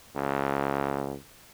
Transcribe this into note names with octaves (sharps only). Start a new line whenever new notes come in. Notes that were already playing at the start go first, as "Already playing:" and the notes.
C#2